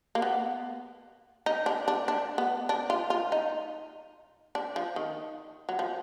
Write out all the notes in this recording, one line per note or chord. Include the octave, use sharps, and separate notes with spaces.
A#3
B3
D#4
D4
D4
D4
B3
D4
F4
F4
D#4
D4
F3
D#3
F#3
F3